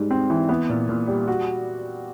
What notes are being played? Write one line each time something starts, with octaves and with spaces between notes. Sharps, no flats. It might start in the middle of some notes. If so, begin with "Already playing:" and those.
Already playing: G#2 G3
C4
E3
B3
A#2
A#2
G3
F#4